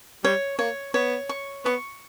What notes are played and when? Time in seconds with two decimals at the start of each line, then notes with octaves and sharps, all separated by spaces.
0.24 G3 C#5
0.59 A#3 C#5
0.94 B3 C#5
1.29 C#6
1.65 B3 C#6